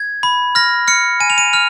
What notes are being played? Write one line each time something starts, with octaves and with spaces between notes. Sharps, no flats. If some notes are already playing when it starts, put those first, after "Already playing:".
Already playing: G#6
B5
F6 A#6
F6 C#7
G#5 D#7
F7
D#7
F6 F7